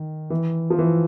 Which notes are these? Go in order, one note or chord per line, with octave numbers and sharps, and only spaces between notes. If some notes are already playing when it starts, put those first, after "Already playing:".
Already playing: D#3
E3
F3
E3